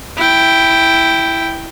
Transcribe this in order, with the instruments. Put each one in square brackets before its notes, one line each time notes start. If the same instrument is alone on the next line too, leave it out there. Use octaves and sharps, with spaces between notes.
[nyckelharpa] E4 G5